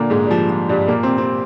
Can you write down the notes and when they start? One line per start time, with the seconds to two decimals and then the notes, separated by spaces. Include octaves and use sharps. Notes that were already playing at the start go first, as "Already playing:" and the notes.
Already playing: A#2 D3 A#3 D4
0.10 G#2 G#3
0.26 G3
0.31 F3
0.50 F3
0.69 G2 G3
0.88 A#2 A#3
1.03 C3 C4
1.18 C3 C4